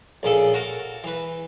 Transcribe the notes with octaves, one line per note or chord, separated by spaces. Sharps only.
A#1 C#3 A4
F#4 A#4 A5
E3 B4